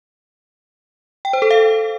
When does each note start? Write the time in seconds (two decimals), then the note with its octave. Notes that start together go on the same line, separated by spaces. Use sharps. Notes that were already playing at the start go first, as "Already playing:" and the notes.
1.25 G5
1.33 C5
1.42 A4
1.50 F5